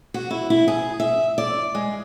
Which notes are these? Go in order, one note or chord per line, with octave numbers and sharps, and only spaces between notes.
F#4
E4
E4
G#4
E5
D5
G#3